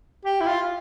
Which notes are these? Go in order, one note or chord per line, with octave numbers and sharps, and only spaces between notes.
G4
E4
F4